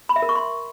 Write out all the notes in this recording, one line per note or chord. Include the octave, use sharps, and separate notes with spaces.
B5
E5
A#4
C#6
C6